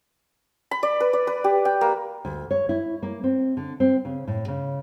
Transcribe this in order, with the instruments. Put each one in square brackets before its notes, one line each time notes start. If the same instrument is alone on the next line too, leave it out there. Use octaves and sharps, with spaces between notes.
[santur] B5
D5
B4
D5
B4
G4
G5
A#3
[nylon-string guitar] D2
C#5
E4
A#3
C4
D3
C4
C#3
A2
C#3